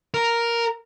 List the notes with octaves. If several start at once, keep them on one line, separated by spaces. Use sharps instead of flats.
A#4